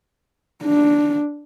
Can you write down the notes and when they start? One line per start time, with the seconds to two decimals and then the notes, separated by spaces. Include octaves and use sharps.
0.64 D4